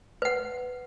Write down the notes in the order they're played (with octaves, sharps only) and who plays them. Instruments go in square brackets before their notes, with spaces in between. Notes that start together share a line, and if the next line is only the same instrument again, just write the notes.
[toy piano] B4 F#5